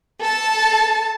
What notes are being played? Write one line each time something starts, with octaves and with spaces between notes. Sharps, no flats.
A4 A5